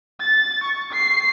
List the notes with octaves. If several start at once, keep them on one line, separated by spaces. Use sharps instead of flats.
A6
C#6
C7